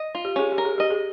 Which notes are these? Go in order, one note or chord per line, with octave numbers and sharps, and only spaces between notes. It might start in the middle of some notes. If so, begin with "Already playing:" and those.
Already playing: D#5
F4
G4
C#4 G#4
G4
A#4
G#4
G4 D#5
G#4